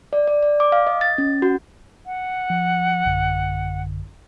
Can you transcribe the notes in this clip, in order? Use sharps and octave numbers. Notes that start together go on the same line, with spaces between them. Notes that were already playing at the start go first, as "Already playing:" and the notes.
D5
D5
D5
D6
F5
D#5
A6
C#4
F#4
F#5
F3
A1 F#2 D3